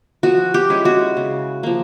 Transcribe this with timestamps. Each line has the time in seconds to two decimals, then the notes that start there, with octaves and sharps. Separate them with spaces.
0.23 F3 F#4
0.54 G4
0.70 G#3 C#4 E4
0.85 F#4
1.17 C#3
1.63 F3 A#3